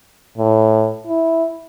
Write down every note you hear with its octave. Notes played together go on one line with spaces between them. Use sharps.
A2
E4